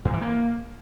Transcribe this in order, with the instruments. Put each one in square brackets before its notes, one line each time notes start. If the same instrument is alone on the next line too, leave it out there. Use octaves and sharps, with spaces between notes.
[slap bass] G2
E3
A#3